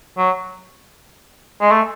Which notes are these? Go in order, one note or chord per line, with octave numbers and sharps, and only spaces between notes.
F#3
G#3
A3